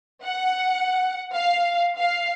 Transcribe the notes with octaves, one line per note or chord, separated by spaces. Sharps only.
F#5
F5
F5